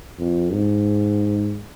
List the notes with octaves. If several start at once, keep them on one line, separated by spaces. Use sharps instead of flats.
F2
G#2